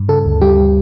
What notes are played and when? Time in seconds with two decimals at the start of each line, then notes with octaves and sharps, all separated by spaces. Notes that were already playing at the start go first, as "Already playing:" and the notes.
Already playing: G2
0.09 C#3 A4
0.25 D2
0.41 G3 G4